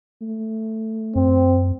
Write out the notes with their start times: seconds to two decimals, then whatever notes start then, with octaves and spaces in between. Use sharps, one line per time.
0.21 A3
1.16 F#2 C4